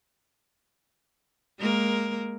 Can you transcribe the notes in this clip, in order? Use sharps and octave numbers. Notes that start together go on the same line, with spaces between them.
G#3 A#3 A#4